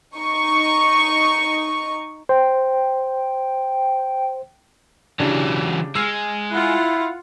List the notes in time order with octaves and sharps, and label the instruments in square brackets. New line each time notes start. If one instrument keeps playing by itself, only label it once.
[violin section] D#4 C#6
[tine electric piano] C5 [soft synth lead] G5
[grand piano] C#3 D4 G4 [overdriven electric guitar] E3 F#3
[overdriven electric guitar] G#3 [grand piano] E6 F6 C7
[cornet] E4 [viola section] F4 F#5